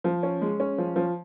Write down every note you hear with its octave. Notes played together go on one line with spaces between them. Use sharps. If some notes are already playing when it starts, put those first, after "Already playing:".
F3
C#4
G#3
C#4
F3
F3